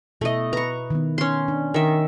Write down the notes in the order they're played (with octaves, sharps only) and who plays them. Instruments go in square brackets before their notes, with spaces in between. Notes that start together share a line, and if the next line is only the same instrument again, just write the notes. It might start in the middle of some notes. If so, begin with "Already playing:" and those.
[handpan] B2 E4 E5 [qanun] A3 D#5
[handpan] B4 [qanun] A#5 C#6
[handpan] D#3 B3
[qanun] C#4 C6
[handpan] D4
[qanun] D#3 E5